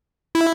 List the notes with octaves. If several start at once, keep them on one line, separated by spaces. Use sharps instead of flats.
E4